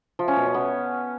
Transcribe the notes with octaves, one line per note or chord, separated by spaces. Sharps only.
F3
C#4
B2
C#4
B3